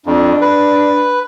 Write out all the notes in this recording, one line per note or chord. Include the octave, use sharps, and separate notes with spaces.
F2 D4
B4